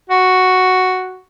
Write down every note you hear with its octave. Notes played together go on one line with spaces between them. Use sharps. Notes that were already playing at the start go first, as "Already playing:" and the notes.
F#4